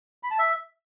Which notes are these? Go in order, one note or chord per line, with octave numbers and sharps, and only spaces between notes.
B5
A5
E5